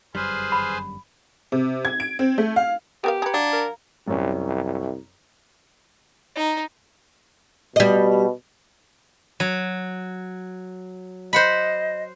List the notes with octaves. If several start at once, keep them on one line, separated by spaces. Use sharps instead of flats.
G1 F#2 G3 G#4 B4 C5 F6
B5
C3
G#6
D7
C4
A3
F5
B3 G4 A#4 F5
G#4 B4 A#5 G#6 C#7
F#3 D4 F5 A#5
A#4
C2 F#2 C#4
D#4
B2 G3 D#5
F#3
C5 D#5 F#5 B5